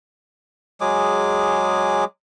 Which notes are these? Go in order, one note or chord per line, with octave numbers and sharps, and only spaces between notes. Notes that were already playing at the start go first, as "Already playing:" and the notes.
F#3 G#3 G#4 D6